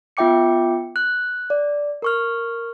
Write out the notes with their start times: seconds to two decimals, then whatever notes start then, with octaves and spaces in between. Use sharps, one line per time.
0.17 B3 F4 E5 G5 D6 C#7
0.96 F#6
1.50 D5
2.02 A#4 C#6 F6